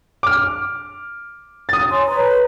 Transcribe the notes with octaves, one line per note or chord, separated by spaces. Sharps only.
D6 F6
D#6 A6
C#5 G#5 C6
B4 C#5 A#5